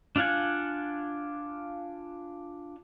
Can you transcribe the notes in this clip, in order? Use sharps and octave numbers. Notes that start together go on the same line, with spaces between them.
D4 F4 F5 F#5 G#5